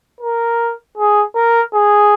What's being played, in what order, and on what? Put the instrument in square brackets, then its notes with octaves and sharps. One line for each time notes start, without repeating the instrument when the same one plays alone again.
[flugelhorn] A#4
G#4
A#4
G#4